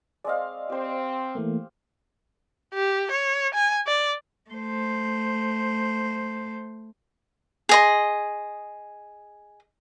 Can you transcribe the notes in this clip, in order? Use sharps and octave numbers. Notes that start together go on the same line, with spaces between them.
G#3 C4 D5 D#5 F5
C4 G4 C5
E3 A3 A#3
G4
C#5
G#5
D5
A3 C5
G#4 D#5 C6